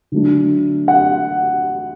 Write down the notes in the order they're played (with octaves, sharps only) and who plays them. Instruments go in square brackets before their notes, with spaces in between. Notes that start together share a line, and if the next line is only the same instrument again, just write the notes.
[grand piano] D3 F#3 A3 D4
[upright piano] F#5